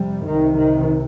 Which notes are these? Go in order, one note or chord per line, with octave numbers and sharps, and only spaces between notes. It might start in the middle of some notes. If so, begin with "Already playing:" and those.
Already playing: F2 C3 G3
C2 C3 D#3
D#3